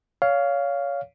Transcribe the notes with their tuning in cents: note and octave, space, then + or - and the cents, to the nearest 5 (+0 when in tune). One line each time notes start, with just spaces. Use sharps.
C#5 +25 F5 +0